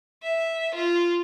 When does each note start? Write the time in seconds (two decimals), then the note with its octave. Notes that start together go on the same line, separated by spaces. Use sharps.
0.23 E5
0.75 F4